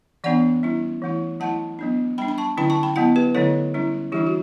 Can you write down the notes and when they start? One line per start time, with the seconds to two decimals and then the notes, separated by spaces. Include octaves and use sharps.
0.24 E3 B3 D4 D5 F#5
0.63 G3 C#4 E4
1.02 E3 A3 E4
1.40 F#3 A3 E4 F#5 A5
1.79 F#3 B3 D4
2.18 G3 D4 G5 B5
2.28 B5
2.38 A5 C#6
2.57 D3 F#3 C#4 E4 G5 B5
2.70 A5 C#6
2.83 G5 B5
2.96 F#3 B3 E4 F#5 A5
3.16 G4 B4
3.35 D3 F#3 A3 E4 A4 C#5
3.74 G3 C#4 E4
4.12 E3 G3 D4 E4 G4
4.27 F#4